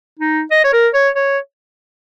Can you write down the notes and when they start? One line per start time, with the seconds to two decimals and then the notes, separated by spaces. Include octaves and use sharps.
0.19 D#4
0.51 D#5
0.64 C#5
0.73 A#4
0.94 C#5
1.16 C#5